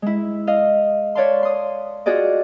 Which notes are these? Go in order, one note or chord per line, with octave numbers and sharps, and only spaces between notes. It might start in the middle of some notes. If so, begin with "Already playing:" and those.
G#3 E4
D#5 F5
B4 C#5 D5 F5 A5 C6
C6 D#6
F4 F#4 G#4 D5 D#5